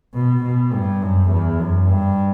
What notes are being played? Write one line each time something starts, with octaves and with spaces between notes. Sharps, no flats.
B2
B2
G2
F#2
E2
F#2
G2